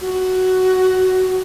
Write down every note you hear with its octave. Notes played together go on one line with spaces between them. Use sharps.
F#4